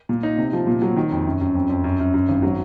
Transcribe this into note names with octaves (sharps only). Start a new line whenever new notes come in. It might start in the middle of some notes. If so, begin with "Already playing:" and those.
A#2
D#4
C3
F3
A#2
F#3
D#3
F2
F#2
F#2
F2
F2
F#2
F#2
F#2
G#1
F#3